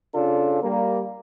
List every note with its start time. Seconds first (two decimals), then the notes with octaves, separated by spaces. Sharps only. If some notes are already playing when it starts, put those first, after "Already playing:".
0.14 C#3 D4 F4 A4
0.63 G3 A#3